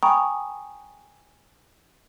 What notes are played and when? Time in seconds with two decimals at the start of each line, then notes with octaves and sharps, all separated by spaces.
0.03 G5 G#5 A#5 B5 C#6 D#6